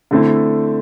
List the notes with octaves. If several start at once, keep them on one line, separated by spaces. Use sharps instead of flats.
D3 A3 C4 E4 A4